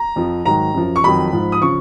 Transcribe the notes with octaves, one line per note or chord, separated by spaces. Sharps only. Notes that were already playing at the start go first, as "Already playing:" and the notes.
Already playing: A#5
F2 F3
G#2 D#3 F#3 A#5
F#2 F3
C#6
F2 D#3 F#3 B5
G#2 F3
D#6
C#3 F3 C#6